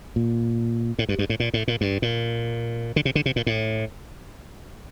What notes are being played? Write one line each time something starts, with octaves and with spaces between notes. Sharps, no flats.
A#2
A2
G2
G2
A2
A#2
A2
A#2
G2
A#2
D3
C3
D3
C3
A#2
A2